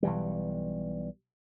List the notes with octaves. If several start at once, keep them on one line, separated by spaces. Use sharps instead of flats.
B1 E3 G3